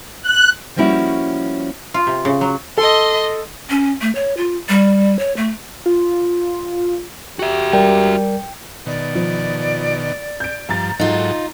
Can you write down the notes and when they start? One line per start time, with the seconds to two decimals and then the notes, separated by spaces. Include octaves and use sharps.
0.22 F#6
0.76 F3 G3 A#3 C#4 E4 F#4
1.94 F4
2.07 C3
2.25 C#3
2.41 F#3
2.78 A4 D#5 C6
3.70 C#4
4.01 A3
4.15 C#5
4.37 F4
4.69 G3
5.19 C#5
5.37 A3
5.86 F4
7.39 F#4 G4 E5
7.73 G3 A#4 D5 G5
8.86 B2 D#3 D5
9.15 F3
10.40 G6 D7
10.69 G2 F3 A#5 A6
11.00 G#2 F#3 D#4 F4 A4